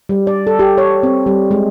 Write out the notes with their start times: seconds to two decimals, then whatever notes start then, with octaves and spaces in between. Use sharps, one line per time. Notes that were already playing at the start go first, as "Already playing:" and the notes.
0.09 G3
0.27 D5
0.47 A4
0.59 G4
0.78 C#5
1.03 C4
1.26 G3
1.51 G#3